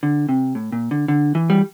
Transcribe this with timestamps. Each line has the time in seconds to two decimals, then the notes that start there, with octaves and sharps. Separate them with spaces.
0.03 D3
0.29 C3
0.55 A2
0.72 A#2
0.91 D3
1.08 D3
1.35 E3
1.50 G3